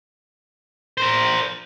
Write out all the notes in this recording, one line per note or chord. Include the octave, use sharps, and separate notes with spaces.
A#4 C5